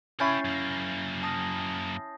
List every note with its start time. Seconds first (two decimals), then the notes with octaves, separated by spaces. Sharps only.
0.20 C#4 E4 C#5 G5 G6 A6 C7
0.45 F#2 A#3
1.23 A5 D#6 A#6